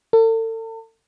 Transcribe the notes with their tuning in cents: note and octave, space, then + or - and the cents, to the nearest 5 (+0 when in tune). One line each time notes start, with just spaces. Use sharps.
A4 +40